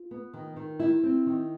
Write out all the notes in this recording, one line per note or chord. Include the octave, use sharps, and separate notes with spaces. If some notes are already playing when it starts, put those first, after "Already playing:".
Already playing: F4
B3
D#3
D#3
G3 E4
C4
D#3